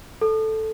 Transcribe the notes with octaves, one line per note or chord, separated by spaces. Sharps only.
A4